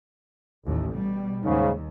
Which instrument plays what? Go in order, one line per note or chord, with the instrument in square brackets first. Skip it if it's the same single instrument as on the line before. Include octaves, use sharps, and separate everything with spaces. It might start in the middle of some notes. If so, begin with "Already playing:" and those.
[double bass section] A1 D#2 A2
B2 G3
[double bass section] D#2 [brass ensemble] G#2 C#3